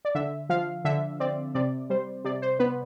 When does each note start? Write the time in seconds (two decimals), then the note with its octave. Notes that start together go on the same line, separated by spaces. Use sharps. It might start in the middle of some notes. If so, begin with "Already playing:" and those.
0.05 D5
0.15 D3 E5
0.49 F3 F5
0.85 D3 E5
1.20 C4 D5
1.55 C3 D5
1.90 G3 C5
2.24 C3 D5
2.42 C5
2.59 B3 B4